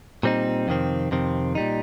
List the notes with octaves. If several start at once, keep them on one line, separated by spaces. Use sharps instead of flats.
A#2 G3 C4 D#4
F2 C3 D#3 C4
F2 C3 D#3 C4
A#2 G3 D#4